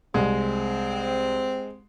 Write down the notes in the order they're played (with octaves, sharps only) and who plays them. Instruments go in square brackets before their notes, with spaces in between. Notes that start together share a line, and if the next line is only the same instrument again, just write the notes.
[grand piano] C2 [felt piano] G#3 [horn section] C4